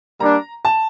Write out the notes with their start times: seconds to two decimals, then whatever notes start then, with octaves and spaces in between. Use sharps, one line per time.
0.20 G3 A#3 D4 A#5
0.65 A5